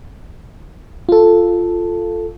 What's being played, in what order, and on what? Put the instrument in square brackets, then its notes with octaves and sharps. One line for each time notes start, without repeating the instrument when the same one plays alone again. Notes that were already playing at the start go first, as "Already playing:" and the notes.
[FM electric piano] F4 A4